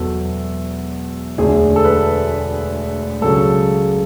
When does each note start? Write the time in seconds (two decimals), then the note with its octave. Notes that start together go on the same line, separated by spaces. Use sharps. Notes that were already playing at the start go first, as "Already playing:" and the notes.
Already playing: E1 E2 B2 F#3 A4
1.38 E1 D2 D3 G#4
1.76 A4
1.84 B4
3.21 C#2 C#3 F#3 A4